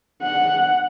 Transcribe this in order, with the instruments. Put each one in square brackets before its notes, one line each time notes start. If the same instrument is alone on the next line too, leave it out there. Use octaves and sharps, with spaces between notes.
[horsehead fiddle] F#5